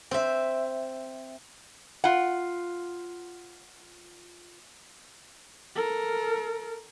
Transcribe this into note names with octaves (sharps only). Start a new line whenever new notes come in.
C4 E5
F4 F#5
A4 A#4